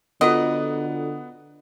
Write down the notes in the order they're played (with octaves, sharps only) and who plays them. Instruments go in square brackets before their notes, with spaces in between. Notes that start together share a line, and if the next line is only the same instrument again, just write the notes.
[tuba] D3 [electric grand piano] B3 F#5 [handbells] F4 F#4 A4 [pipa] D#5